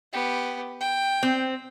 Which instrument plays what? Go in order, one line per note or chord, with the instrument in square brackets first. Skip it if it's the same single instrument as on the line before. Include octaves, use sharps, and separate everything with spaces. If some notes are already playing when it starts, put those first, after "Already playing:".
[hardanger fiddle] B3 G4
G5
[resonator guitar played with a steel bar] C4